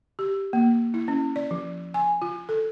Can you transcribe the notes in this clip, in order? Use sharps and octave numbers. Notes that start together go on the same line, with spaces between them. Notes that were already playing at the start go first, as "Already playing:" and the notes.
G4
A#3
E4
C#4
D5
F3
G#5
F4
A4